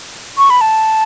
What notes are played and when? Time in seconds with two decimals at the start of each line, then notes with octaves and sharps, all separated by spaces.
0.38 C#6
0.50 B5
0.61 A5